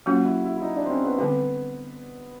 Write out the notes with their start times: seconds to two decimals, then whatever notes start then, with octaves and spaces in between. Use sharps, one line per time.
0.06 F#3 A#3 C#4 F4 F#4
0.25 E4
0.44 E4
0.57 E4
0.62 D#4
0.76 D4
0.86 C4
0.90 C#4
1.05 B3
1.18 D3 G3 B3 C4